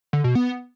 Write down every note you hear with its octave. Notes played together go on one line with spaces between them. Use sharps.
D3
B2
B3